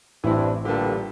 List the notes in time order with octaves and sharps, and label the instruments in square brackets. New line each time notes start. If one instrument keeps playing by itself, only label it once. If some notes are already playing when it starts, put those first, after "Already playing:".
[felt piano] A1 [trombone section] G2 C4 D4 [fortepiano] E3 E4
[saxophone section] A#2 D3 E3 [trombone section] G3 [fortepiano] G4 A4